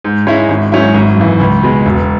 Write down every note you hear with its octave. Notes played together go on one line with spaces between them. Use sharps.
G#2
G#3 C#4 E4
G#1
G#2 F#3 C#4 E4
G#1
F#2 E3
C#2
B2 G#3
E1